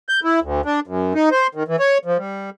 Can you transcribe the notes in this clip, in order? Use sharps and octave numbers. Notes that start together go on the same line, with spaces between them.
G6
E4
D2
D4
F#2
D#4
C5
D#3
E3
C#5
F3
G3